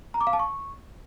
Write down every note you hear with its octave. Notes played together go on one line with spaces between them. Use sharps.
A#5
D6
F5
A5
C#6